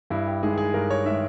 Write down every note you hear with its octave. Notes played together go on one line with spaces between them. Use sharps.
G2 E4
G4
D#3 G#3 G#4
G#4
G2 A#4
C#5
D#3 G#3 E5